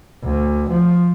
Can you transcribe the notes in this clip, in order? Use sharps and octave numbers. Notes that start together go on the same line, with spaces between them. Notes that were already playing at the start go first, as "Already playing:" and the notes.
D2
F3